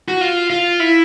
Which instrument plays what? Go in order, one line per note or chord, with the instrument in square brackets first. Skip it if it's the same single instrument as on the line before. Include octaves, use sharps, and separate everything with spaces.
[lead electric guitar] F#4
F4
F4
E4